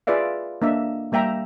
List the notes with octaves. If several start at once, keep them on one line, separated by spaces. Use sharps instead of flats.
F4 G#4 B4 D5 E5 F5
A#3 D4 D#5 E5
G3 A#3 E5 G5 A#5